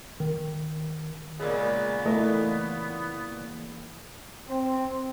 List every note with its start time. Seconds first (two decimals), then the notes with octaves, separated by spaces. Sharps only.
0.20 D#3
1.40 A#2 C#3 G#3 A#3 B3
2.06 E3 A3 A#3 D#5
4.48 C4